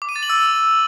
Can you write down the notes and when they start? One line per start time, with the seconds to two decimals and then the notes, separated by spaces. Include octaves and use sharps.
0.02 D6
0.09 D#7
0.16 A6
0.23 F#7
0.30 E6